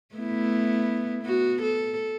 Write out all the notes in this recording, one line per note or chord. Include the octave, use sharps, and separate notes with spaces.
A3 B3 E4
B3 F#4
A4